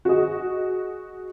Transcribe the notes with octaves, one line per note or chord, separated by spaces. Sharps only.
F#4 G#4 D#5